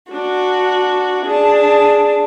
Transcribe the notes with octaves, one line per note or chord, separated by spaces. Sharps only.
D4 F#4
D4 G#4 A5